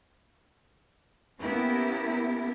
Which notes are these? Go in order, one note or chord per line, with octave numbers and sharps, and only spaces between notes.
A#3 B3 C#4 E4 G4 A#4